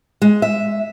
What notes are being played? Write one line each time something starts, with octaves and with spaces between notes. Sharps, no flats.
G#3
E5